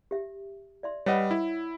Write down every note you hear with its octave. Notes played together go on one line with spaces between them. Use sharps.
G4 E5
D5 E5 C6
G3 B4 C#5 D#5 F#5
E4